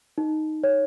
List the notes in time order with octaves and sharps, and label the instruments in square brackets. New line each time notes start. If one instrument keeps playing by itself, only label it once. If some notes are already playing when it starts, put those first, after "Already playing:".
[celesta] D#4
C#5